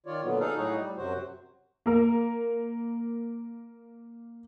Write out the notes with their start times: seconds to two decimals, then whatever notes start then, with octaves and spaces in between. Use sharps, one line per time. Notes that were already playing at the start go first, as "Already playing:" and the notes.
0.06 D#3 F4 C#5 D5
0.23 A#2 D3 F#3 B3
0.40 D#4 G#4 A4 F5
0.56 A2 F#3 D#4 F#4 G#4
0.76 G3
0.97 F#2 C3 F#3 F#4 C5
1.86 A#3 A#4